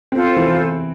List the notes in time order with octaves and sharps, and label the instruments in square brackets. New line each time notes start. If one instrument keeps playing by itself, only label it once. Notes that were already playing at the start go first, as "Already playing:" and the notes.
[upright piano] C4 [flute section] F4 A4 C5
[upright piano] E3